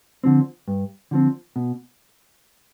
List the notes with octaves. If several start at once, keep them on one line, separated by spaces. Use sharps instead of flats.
D3 F3 C4
G2
D3 F3 C4
B2